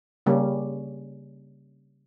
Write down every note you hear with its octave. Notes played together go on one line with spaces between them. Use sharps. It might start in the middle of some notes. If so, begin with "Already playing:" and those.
C#3 G3 A#3 C#4